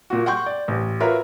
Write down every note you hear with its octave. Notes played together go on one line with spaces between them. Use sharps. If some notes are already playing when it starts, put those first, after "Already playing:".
A#2 F4 F#4
F#5 G5 C6 C#6 G6
D5
A1
F4 F#4 A#4 B4 C#5 E5